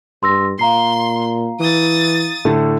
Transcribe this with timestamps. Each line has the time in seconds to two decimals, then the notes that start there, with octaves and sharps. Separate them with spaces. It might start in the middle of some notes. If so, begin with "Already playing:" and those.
0.23 G2 C6 E6 A#6
0.59 A#2 F5 A#5 C6 C7
1.60 E3 D#6 A6
2.45 A2 D3 A3